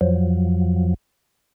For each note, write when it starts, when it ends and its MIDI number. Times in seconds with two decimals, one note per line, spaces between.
0.01 0.94 41
0.01 0.94 53
0.01 0.94 54